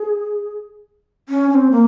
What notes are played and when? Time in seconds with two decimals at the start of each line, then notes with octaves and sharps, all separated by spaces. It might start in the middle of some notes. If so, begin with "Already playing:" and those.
Already playing: G#4
1.29 C#4
1.50 C#4
1.55 C4
1.71 A#3